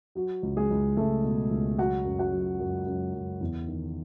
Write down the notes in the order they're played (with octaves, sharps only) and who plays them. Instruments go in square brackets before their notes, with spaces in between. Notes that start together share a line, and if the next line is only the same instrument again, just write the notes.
[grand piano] F#3 F#4
C#2
G#3 G#4
C#2
C#2 A3 A4
B2
C#2
F#3 F#4 F#5
F#2
F#4 F#5
F#3
F#2
F#2
F#2
E2
D#3